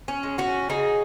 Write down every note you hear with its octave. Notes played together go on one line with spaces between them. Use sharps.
C#4
G#3
C#4 F#4
C#3 D#4 G#4